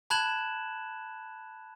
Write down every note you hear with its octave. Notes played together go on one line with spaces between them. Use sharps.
A5 B5 F#6 G#6 E7 F#7